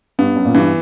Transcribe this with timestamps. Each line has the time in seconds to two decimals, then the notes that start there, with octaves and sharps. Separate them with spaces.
0.19 G2 B3
0.36 F#2
0.45 A#2
0.54 G2 E3